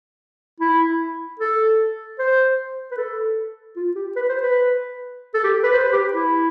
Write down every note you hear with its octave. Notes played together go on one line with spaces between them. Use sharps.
E4
A4
C5
B4
A4
F4
G4
B4
C5
B4
A4
G4
B4
C5
B4
G4
E4